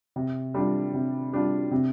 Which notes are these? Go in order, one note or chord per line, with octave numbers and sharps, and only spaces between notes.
C3
G3 D4 F4
C3
G3 D4 F4
C3